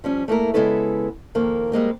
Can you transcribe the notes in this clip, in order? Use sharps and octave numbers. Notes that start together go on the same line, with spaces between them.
F3 G3 C#4
A3 A#3 E4 A#4
C#3 G#3 B3 E4 A4 B4
F2 D#3 A#3
G3 G#3 A#3 C4